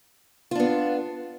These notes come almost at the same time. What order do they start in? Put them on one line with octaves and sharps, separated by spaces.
F4 D4 B3